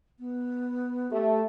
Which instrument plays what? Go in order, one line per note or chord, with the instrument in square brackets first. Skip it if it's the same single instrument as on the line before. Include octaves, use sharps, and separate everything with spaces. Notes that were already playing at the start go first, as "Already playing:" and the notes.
[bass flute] B3
[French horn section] A3 [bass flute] G4